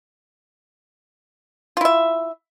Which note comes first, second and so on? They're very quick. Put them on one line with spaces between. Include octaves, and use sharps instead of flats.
F4 E4 E5